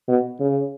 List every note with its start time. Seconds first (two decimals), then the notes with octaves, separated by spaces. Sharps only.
0.08 B2
0.40 C#3